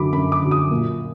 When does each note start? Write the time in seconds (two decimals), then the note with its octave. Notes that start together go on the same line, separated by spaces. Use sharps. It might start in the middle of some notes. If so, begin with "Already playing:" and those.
Already playing: F#2 D3 F#3 B5 D6
0.13 F#2 B5
0.32 D6
0.42 D3 F#3
0.51 D#6
0.71 A#2